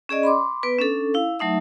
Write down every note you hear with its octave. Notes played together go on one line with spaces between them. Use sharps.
C#4 G#4 D5 D#5
B5 C6 D6
B3 B4
C#4 D4 A4
E4 F5
F#3 A3 D#4 E5